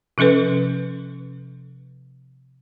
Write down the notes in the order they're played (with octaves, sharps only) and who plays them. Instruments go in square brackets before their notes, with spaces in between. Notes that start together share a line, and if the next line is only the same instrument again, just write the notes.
[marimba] C3 F3 C#4 A4 B4